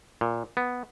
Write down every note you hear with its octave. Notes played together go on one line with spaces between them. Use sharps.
A#2
B3